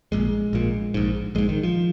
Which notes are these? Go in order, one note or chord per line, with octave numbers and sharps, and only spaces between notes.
A#1 A#2 G#3
A#1 A#2
A#1 G#2
A#1 G#2 G#3
D#3
F3